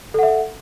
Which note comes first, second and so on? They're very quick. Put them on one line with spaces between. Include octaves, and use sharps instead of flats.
A4 F#5 E5